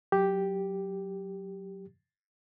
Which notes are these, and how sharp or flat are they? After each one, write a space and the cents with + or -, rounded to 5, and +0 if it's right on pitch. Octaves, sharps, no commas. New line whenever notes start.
F#3 +0 G4 +0